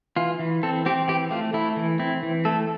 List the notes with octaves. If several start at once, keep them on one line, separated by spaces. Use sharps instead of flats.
E3 F4
E3
C4 A4
C4 G4
E3 G4
A3 F4
A3 E4
E3
C4 E4
E3
A3 A4